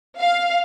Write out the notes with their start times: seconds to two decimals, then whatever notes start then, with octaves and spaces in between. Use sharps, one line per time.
0.19 F5